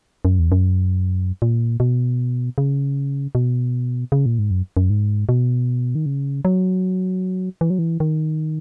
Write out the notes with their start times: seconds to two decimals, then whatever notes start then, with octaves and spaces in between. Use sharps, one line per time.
0.25 F#2
0.39 E2
0.52 F#2
1.42 A#2
1.80 B2
2.58 C#3
3.35 B2
4.12 C#3
4.26 A#2
4.39 G#2
4.51 F#2
4.77 F#2
4.90 G#2
5.29 B2
5.95 D#3
6.06 C#3
6.45 F#3
7.61 E3
7.70 F#3
7.79 E3
8.00 D#3